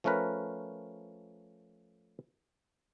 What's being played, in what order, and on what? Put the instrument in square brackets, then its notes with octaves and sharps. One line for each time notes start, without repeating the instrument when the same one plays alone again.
[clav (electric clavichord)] F3 A3 C#4 A#4 B4